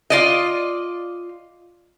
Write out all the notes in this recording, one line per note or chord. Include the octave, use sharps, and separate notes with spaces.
F4 D5 D#5